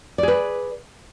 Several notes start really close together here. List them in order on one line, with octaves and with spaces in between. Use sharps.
D5 G#4 B4